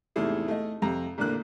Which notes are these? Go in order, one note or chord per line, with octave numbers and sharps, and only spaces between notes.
E2 G#2 C3 A3 E4 G#4
A3 D#5
F2 C3 A#5
A1 A#2 D3 A#3 F#6